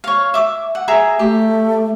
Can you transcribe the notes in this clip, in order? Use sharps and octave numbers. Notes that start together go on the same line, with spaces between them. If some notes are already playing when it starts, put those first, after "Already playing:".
C#5 F5
E5 D6
F#5
G#4 E5 A#5
A3 G4